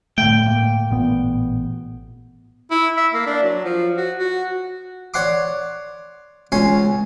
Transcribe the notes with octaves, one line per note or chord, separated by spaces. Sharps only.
A2 D3 A3 G5
A2 A#3
A1 A#2 B3
E4
E5
A#3
D4
F#3
F3
F#4
F#4
C#5 D5 F#5 C6 D6
C#2 C#4 C#5 G#5 C6